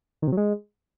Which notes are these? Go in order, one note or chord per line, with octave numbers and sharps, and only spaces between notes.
D#3
C3
F#3
G#3